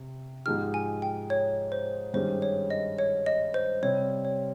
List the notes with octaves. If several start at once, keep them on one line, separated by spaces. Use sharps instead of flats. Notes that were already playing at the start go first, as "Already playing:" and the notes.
Already playing: C3
G#2 F3 G#3 D#4 G4 F6
G#5
G5
C#5
C5
G2 D#3 G#3 C#4 G4 C5
C#5
D#5
C#5
D#5
C5
C3 G3 C4 G4 C#5
C#5